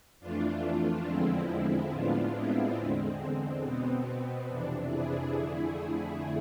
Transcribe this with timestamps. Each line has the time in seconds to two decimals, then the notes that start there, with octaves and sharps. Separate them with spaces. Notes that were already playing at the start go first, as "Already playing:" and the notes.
0.20 F2 E3 A3 D4 F4
1.05 E2 D3 F3 G#3 C4 E4
1.91 A2 G#3 B3 D4 F4
2.34 C4 E4
2.77 E2 D3 G#3 C4
3.20 C4
3.62 B2 B3 C4
4.47 F2 C3 E3 D4
4.89 E4 G#4
5.33 F2 D3 A3